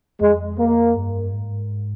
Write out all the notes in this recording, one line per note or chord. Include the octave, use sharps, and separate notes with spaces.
F2 G#3
A#3
G2
G#2